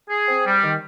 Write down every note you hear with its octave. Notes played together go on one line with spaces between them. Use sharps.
G#4
C4
G3
D#3